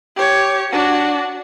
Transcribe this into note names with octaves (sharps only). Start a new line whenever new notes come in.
G4 C#5
D4 F#4